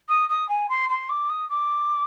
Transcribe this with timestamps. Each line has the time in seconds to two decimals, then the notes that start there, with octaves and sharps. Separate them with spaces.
0.09 D#6
0.29 D#6
0.49 G#5
0.69 C6
0.89 C6
1.09 D6
1.29 D#6
1.49 D6